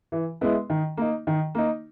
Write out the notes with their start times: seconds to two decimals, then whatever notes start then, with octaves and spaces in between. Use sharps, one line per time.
0.12 E3
0.41 G#3 B3 E4
0.70 D#3
0.97 A#3 D#4
1.27 D#3
1.55 A#3 D#4